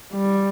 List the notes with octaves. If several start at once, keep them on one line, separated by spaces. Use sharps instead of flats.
G3